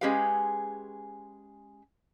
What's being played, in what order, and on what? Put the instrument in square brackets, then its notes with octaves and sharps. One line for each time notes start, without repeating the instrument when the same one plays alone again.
[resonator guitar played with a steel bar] G#3 C#4 G4 G#4 B4 F5